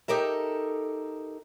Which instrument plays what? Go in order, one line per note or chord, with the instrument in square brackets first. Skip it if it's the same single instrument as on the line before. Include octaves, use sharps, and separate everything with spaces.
[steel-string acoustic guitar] D#4 G4 A4 A#4 E5